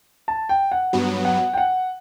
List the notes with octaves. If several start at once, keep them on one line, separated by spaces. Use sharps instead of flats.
A5
G5
F#5
G2 F#3 B3
F#5
G5
F#5